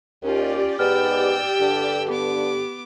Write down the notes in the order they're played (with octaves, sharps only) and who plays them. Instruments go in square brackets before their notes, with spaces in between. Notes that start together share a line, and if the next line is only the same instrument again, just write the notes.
[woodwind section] D#2 [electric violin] C#4 F4 [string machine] G4 D5
[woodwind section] G#2 B3 [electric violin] G5 E6 [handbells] F6
[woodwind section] G2 D3
[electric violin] B3 D6 [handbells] G4